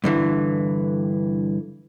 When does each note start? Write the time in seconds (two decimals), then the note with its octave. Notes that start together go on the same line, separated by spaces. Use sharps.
0.04 G2 D3 E3